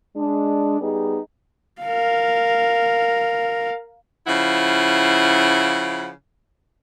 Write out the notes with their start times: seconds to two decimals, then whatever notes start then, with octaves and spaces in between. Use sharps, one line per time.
0.17 G#3 D4
0.81 G3 B3 D#4 G#4
1.82 A#4 F5
4.27 C#3 F3 E4 F#5